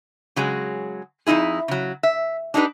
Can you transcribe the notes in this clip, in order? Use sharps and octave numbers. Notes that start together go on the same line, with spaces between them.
C#3 F#3 G#3 G#4
F2 F3 D#4 E4 G#4
C#3 F#3
E5
D4 D#4 G4 G#4 B4